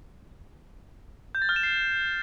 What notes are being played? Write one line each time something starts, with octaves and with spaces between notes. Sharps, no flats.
G6
A6
F6
E7
C7